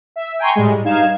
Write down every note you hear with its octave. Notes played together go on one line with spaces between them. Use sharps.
E5
G5 G#5 A#5 C6 C#6
A2 G3 G#3
G2 D#4 F5 G#6 E7